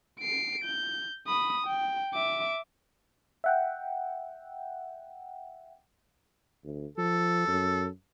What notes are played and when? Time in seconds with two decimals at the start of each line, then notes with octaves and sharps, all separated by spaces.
0.20 C7 D7
0.64 G6
1.27 B5 D#6
1.67 G5
2.14 E5 D6
3.44 E5 F#5 G5
6.64 D2
6.98 F3 A4
7.48 F#2